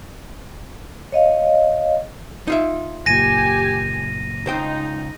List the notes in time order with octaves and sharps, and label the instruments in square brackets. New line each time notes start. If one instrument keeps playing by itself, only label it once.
[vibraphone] C#5 D#5 F5
[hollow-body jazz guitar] D#4 F4 E5
[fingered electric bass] F#1 A#2 [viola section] G4 G#5 [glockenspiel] A#6 D#7
[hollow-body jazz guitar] C#2 C5 G5 [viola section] D#4